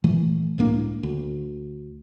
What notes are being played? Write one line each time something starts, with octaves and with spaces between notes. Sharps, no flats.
A#2 E3 A3
C#2 A2 A#3 D4
D2